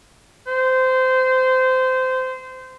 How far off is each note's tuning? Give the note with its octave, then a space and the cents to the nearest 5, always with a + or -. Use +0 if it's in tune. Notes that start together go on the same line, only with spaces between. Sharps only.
C5 -20